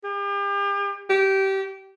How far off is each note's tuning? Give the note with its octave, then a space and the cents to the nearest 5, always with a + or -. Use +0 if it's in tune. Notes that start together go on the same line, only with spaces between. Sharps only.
G4 +40
G4 -20